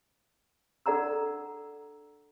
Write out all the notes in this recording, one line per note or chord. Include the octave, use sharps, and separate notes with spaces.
D4 A4 D5 F#5 A#5 E6